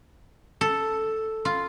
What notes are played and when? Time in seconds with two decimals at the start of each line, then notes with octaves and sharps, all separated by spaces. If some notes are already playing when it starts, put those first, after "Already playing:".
0.61 A4
1.45 F4